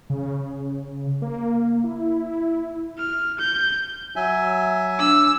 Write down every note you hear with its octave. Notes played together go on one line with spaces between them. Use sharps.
C#3
A#3
E4
F6
G6
F#3 E5 G#5
D4 E6